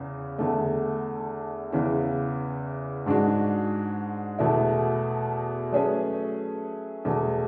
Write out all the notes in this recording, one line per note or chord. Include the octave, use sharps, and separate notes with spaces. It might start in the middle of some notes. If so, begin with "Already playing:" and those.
Already playing: E2 C#3
E2 D3 A3
E2 C#3 E3
G#2 G#3 D4 F#4
E2 B2 A3 E4
F#3 A3 C#4 G#4 B4
E2 B2 A3